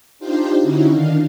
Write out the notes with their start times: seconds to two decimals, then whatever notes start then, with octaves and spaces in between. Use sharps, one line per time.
0.19 D4 D#4 F4 G4 C5
0.60 D3 C#4 D#4 E4 F#4
0.91 D#3 D4 F5